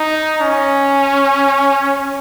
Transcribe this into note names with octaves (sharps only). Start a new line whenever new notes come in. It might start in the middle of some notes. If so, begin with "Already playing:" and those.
Already playing: D#4
C#4